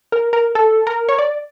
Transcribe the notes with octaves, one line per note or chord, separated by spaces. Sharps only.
A#4
A#4
A4
A#4
C#5
D5